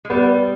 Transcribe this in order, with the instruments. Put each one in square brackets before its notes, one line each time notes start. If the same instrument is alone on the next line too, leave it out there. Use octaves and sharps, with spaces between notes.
[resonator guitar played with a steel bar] G#3
[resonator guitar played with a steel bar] G3 [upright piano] B3